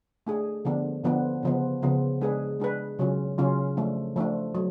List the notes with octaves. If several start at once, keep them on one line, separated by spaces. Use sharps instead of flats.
A3 D4 G#4
D3 F3 B3 D4
D3 F3 B3 D4
C#3 F3 B3
C#3 F3 B3
G#3 D4 G#4 B4
G#3 D4 G#4 B4
C#3 F#3 C#4 F4
C#3 F#3 C#4 F4
F3 A3 D4
F3 A3 D4
F#3